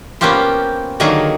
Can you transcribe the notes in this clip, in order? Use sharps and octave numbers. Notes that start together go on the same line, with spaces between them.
A#3 B3 C#4 F4 G4 C5
D3 D#3 F#3 A#3 G#4